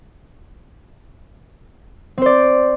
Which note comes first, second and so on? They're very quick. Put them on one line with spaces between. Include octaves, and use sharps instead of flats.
C4 C5 D5